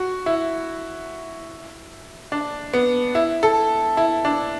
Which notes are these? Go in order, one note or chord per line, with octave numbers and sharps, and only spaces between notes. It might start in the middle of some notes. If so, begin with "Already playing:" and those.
Already playing: F#4
E4
D4
B3
E4
A4
E4
D4